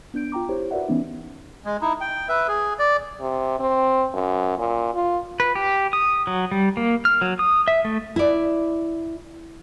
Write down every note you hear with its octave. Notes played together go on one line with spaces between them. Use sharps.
B3 D4 G6 D7
F4 G5 A#5 D6
E4 G4 C5 C#5
F#4 A#4 B4 D5 E5 F#5
E3 B3 C#4 D#4
G#3
D#4 E4
G5
B4 E5
G#4
D5
C3
C4
F#2
A#2
F4
B4
G4
D#6
F#3
G3
A#3
F6
F#3
D#6
E5
A3
E4 D5